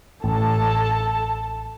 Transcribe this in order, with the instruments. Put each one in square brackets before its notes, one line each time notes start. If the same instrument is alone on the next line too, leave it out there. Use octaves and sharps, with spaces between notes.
[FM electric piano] A1 [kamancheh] A4 A5